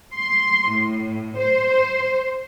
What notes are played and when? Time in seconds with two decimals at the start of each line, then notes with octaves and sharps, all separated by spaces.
0.13 C6
0.69 A2
1.38 C5